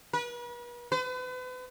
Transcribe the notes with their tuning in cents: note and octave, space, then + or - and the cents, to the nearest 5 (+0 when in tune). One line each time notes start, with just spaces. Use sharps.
B4 -40
B4 +40